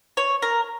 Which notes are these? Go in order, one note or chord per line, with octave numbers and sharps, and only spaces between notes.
C#5
A#4